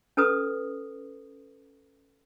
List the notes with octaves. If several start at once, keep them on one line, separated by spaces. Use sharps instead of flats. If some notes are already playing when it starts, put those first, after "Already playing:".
C#4 A4 B4 D#6